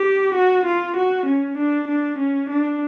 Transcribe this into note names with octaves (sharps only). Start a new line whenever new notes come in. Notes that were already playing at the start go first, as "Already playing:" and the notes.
Already playing: G4
F#4
F4
F#4
C#4
D4
D4
C#4
D4